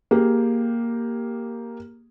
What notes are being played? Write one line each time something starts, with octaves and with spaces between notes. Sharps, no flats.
A#3 G4 G#4